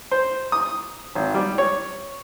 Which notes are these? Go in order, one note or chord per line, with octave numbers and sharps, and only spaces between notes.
C5
D#6
G#1
G3
C#5